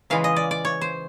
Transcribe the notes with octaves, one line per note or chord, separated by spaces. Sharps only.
C#3 E3 G#3 F5
D#5
D5
D5
C#5
C5